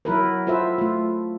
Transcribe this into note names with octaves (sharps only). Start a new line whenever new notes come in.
F#3 E4 A#4 B4
F4 A4 B4 C5 E5
A3 F4